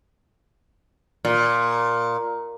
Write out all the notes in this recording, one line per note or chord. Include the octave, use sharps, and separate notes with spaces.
A#2